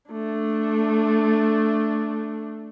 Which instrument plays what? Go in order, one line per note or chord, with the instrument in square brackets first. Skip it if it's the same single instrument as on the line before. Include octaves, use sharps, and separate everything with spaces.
[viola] A3 D4